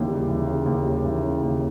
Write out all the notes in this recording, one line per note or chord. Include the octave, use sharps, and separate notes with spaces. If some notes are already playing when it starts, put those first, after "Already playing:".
Already playing: D#2 C#3 E3
G3
E3
C#3
D#2
G3
E3
C#3
D#2